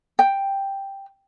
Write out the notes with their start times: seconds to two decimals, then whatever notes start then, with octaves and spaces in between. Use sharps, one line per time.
0.19 G5